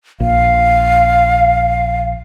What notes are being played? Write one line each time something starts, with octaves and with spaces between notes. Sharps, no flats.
A#1 F5